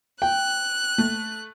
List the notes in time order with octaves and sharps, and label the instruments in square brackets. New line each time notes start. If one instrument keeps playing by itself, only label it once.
[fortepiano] G5 [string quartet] F#6
[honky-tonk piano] A3